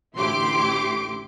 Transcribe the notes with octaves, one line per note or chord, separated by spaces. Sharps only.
A1 D2 E4 G4 C6 D6